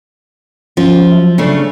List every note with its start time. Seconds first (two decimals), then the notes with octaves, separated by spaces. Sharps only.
0.77 G1 F3 C#4 F4
1.12 F#3 E5
1.38 C#3 A3 D4